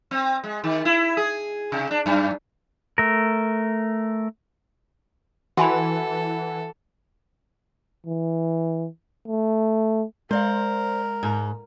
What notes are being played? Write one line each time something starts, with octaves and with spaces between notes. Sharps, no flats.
C4
G#3
D#3
E4
G#4
C3
D4
F#2
A3 A#4
E3 F#4 A4 F#5 G#5 B5
E3
A3
G#3 A#4 C5 D5 F5
G#2